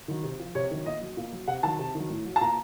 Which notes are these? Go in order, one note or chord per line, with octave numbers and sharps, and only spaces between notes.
D#3 F#3
C3
F3
C3 C#5
D#3 F#3
A#2 D#5
F#3
A#2
F#3
C3 F#5
D#3 F#3 A5
C3
D#3 F#3
A2
F#3
A5
A#2 A#5